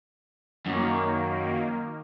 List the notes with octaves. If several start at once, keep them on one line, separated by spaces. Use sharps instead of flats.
F#2 D#3 A#3